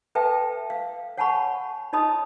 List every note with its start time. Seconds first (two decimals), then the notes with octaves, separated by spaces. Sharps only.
0.15 A4 B4 E5 G5 A5
0.70 F5
1.18 C#5 F#5 G#5 A5 B5 C#6
1.93 D#4 C#5 D#5 A5 B5 D#6